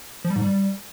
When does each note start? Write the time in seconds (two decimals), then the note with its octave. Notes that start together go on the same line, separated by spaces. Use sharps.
0.24 F3
0.30 G3
0.36 G#2
0.42 G3